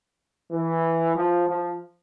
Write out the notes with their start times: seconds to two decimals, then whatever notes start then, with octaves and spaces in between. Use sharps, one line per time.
0.51 E3
1.15 F3
1.48 F3